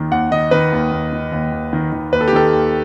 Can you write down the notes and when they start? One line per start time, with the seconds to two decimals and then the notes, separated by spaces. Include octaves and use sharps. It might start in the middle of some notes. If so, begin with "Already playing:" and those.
Already playing: D#2 D#3
0.11 D#2 F#5
0.31 D#3 D#5
0.51 D#3 B4
0.72 D#2
0.92 D#2
1.13 D#3
1.32 D#2
1.52 D#2
1.73 D#3
1.92 D#3
2.12 D#2 B4
2.21 A4
2.28 G4
2.33 D#3 A4
2.53 D#2